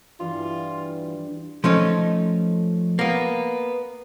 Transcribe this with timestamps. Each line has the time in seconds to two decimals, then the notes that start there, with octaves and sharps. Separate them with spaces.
0.20 G2 E3 F4
1.64 F3 A3 C#4 D#4
2.99 A#3 B3